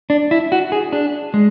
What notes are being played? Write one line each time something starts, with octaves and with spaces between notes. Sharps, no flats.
D4
E4
F#4
G#4
D4
G#3